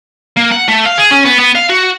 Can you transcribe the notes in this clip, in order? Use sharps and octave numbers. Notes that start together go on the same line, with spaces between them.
A#3
F#5
A3
F5
G#4
C#4
B3
B3
F5
F#4